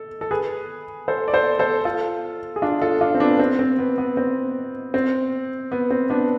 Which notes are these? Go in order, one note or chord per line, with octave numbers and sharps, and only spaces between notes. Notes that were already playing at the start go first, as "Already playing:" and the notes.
Already playing: A4
A4
G#4 B4
A4 C5
D5
A4 C5
A4 C5
F4 A4
G#4
D4 F4
F4 A4
D4 F4
C4
B3 D4
C4
C4
B3
B3
C4
C4
B3
C4
B3 D4